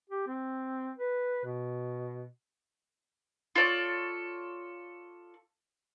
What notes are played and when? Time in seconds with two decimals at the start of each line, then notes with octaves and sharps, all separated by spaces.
0.09 G4
0.27 C4
0.97 B4
1.45 B2
3.55 F4 A4 C#5 D5